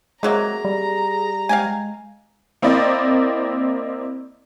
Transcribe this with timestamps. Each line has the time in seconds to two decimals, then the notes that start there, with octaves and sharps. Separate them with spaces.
0.23 C3 F#3 G#3 A#3 G#4 A#5
0.65 G3
1.49 G#3 F5 G5 G#5
2.62 A#3 C4 E4 D5 D#5